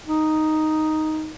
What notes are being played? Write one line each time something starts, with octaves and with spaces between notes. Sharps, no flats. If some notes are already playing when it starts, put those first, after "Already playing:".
D#4